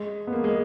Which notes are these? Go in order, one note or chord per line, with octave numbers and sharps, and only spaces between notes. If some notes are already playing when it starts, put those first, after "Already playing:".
Already playing: G#3
B3
A#3
G#3